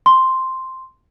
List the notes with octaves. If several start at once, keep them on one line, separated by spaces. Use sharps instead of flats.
C6